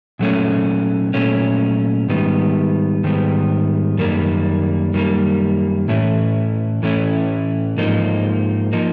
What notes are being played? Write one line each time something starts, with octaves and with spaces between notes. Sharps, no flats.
A#2 F#3 A3 C#4
A#2 F#3 A3 C#4
G#2 D#3 G3 B3
G#2 D#3 G3 B3
F#2 D#3 G3 A#3
F#2 D#3 G3 A#3
A2 E3 A3 C#4 E4
A2 E3 A3 C#4 E4
G#2 F3 A#3 D#4
F3 A#3 D#4